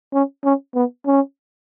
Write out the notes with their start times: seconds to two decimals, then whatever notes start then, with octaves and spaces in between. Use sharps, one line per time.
0.13 C#4
0.44 C#4
0.75 B3
1.06 C#4